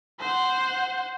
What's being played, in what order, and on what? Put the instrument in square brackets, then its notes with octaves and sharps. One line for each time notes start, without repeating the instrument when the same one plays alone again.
[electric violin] C5 F#5